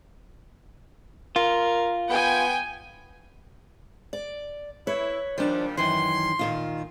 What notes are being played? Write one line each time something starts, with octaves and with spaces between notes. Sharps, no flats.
F4 A#4
B3 G5 G#5
D5
E4 B4 C#5
A#2 D#3 F3 G3 D4
F#2 D#3 E3 C6
A#2 D#3 F4